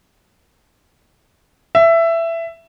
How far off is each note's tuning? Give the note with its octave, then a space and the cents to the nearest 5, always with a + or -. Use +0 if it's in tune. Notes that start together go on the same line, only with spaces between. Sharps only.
E5 +15